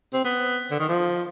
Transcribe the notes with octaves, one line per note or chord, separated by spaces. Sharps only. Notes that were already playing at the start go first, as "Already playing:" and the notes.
C4
B3
D3
D#3
F3